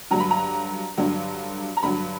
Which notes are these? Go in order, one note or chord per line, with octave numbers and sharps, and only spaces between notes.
G2 D3 F#3 A#5
B5
A#5
G2 D3 F#3
A#5
G2 D3 F#3 B5